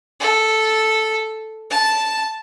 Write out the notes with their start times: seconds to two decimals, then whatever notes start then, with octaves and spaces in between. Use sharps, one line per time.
0.20 A4
1.71 A5